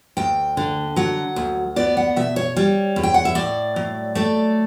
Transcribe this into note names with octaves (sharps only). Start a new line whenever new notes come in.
D2 G5
D3
F#3 F#5
D2
B3 D5
F#5
B2 E5
C#5
G3 C#5
E2
G5
F#5
E5
A2 D5
F#3
A3 D5